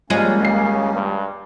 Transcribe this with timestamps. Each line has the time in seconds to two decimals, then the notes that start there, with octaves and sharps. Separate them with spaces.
0.10 F3 G3 G#3 A#3 C#4 C#5 D#5
0.41 D#1 C#3 C7
0.94 G2